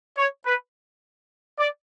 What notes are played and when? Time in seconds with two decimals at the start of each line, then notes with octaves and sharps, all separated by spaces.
0.18 C#5
0.46 B4
1.59 D5